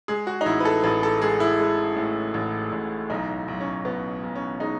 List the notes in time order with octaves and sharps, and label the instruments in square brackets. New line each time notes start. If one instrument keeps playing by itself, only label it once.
[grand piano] G#3 G#4
F#4
D#4
A1 E4
B4
A4
A1 B4
A4
G#3 G#4
E4
G#3
A2
A1
A1
B1 D#4
B1
C#4
B2 B3
B1
C#4
G#3 D#4